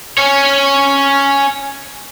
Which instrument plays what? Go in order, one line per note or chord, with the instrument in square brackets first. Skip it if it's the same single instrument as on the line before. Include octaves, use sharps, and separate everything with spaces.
[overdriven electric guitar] C#4 C#5